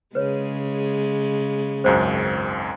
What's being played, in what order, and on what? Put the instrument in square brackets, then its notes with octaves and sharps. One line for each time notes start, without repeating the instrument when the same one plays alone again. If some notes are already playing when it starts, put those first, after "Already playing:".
[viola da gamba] C#3 G#3 [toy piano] B4 C#5
[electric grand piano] G#1 C#2 F#2 [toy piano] C5